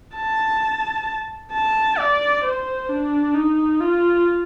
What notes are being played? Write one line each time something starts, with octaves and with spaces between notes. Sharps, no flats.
A5
A5
D5
C5
D4
D#4
F4